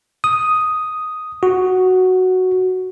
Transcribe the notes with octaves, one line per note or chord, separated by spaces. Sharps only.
D#6
F#4